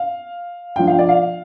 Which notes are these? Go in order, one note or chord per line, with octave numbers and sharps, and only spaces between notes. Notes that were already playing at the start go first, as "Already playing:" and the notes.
Already playing: F5
F3 D4 F4 G5
F5
D5
F5